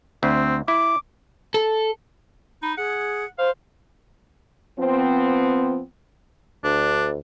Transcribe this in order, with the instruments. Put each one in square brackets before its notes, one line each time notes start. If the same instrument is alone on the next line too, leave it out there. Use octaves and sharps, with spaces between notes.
[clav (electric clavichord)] D2 [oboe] C4
[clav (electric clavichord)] E4 [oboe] D6
[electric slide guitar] A4
[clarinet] D#4 [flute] B5
[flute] G#4 [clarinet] F#5
[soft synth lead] C5 [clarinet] F5
[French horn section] F3 B3 C4
[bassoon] D2 [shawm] D4